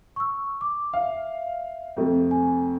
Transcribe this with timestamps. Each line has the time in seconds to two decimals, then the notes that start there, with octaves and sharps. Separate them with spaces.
0.16 C#6 E6
0.61 D6
0.93 E5 F5
1.96 F2 C3 A3
2.31 G#5